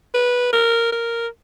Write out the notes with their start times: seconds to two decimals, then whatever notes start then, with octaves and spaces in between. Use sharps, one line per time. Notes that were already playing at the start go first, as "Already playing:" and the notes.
0.14 B4
0.53 A#4
0.92 A#4